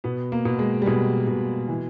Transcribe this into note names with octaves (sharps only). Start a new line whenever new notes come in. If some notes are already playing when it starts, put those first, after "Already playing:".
B2 B3
A#3
B2
G#3
G3
B2 G#3
B2
E3